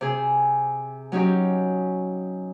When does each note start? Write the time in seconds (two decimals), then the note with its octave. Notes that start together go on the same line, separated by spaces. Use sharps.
0.01 C3 G#4
1.12 F#3 C#4 D#4 G4